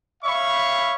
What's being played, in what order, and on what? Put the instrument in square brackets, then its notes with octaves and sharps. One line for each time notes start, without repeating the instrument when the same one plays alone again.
[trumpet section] C#5 E5 F5 B5 C#6